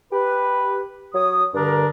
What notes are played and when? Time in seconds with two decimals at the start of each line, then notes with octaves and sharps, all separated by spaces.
0.13 G4 B4
1.15 F#3 C#5 D#6
1.54 G2 D3 D4 A#4